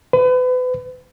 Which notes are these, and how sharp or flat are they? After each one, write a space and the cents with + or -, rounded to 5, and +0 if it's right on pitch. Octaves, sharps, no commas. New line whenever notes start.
B4 +35